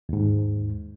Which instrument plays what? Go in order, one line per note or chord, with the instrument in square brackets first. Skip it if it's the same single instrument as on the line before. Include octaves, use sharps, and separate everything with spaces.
[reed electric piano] D#2 G#2